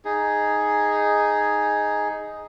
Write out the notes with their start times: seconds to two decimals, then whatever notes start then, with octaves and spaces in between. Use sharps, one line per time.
0.05 D#4 G#4